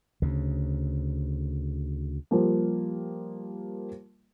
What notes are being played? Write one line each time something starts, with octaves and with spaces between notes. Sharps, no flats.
D2 C#3
F3 G3 A#3